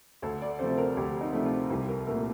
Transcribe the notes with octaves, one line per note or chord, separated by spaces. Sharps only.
D2 A4
D5
C3 F3 A3 C5
A#4
D2 G4
D#4
C3 F3 A3
F4
C2 G4
A#4
A#2 A3 A#4